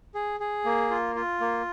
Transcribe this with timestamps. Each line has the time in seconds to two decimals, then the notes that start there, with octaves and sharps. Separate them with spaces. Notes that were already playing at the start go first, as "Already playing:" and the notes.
0.15 G#4
0.40 G#4
0.65 A#3
0.90 F4
1.15 F4
1.41 A#3